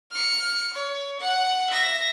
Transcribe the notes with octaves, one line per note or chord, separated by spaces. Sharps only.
F6 C#7
C#5
F#5
E5 A#6